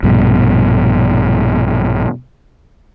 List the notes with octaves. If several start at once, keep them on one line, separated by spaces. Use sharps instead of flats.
A#1 G2 B2